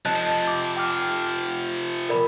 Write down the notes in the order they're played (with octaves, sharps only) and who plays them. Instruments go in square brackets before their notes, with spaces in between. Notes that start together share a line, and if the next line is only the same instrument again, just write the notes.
[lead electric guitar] C3 F3 [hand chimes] D#5 A5 F#6
[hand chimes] D6
G5 D6 F6
A#4 D5 B5